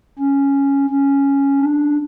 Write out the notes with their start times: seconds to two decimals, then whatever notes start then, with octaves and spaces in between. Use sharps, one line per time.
0.19 C#4
0.90 C#4
1.60 D4